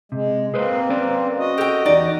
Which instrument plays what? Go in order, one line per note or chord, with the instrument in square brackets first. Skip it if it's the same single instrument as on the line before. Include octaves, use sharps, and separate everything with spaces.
[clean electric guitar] C3 [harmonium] G#3
[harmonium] A#3 C4 [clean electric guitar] G#4 B4 C5
[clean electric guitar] C#4 B4 D5
[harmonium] F#4 D#5
[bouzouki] G4 G5 [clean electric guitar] A4
[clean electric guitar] E2 D#4 [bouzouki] D5